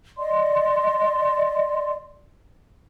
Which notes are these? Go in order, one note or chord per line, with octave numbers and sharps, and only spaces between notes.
D5 D#5 C6